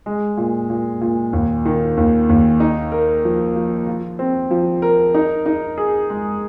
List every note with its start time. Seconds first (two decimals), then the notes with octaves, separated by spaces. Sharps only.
0.06 G#3
0.37 A#2
0.70 A#2
1.01 A#2
1.33 D#2
1.65 D#3
1.97 D#2
2.29 D#2
2.60 D#4
2.92 A#4
3.24 F3
3.56 F3
3.87 F4
4.19 C4
4.51 F3
4.82 A#4
5.14 D#4
5.46 D#4
5.77 G#4
6.10 G#3